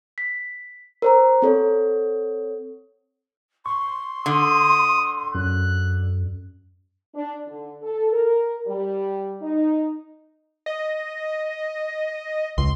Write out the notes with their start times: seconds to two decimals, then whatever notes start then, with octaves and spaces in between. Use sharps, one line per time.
0.18 B6
1.02 A#4 C5 A#5
1.42 C4 A4 C#5
3.66 C6 C#6
4.26 D3 D#6
5.35 F#2 F#6
7.15 D4
7.48 D3
7.83 A4
8.13 A#4
8.67 G3
9.42 D#4
10.66 D#5
12.58 C#2 C6